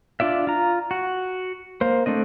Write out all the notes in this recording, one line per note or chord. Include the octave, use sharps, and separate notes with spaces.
D4 F4 D5 E5
F4 A#5
F#4
A#3 C5
A3 C4 D4 D#5